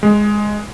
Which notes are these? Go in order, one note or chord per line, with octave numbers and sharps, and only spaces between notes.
G#3